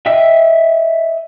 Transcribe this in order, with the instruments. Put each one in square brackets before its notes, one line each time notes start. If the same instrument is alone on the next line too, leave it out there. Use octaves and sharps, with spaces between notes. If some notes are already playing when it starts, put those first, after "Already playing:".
[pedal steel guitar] D#5 E5 G5 E6